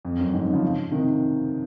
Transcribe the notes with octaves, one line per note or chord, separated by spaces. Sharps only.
F2
F#2
F2 G#2
C#3 F3
C3 D#3